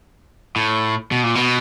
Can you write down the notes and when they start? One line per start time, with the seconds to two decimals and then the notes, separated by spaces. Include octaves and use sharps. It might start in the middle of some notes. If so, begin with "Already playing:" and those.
0.56 A2
1.11 B2
1.23 A#2
1.35 B2